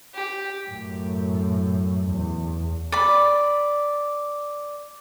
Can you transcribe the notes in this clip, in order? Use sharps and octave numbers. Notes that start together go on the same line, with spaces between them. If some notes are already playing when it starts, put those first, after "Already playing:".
G4
F#2 A2
E2
D5 B5